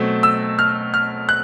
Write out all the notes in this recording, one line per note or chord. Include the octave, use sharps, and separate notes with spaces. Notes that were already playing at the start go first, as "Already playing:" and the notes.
Already playing: B2 F#3 A3 C4
E6
F6
F6
F#6